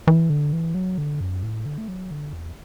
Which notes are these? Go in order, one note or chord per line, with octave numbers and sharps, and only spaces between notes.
E3
D3
E3
F#3
D3
F#2
A2
D3
A3
F#3
D3
E2